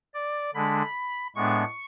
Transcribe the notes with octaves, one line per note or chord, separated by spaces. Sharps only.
D5
D3 G#3 D4 B5
A2 G#3 B3 D4 C#6